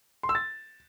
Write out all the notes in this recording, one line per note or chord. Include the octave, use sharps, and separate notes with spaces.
C6
E6
A6